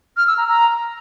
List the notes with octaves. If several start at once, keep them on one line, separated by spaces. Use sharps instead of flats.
F6
E6
A#5
A#5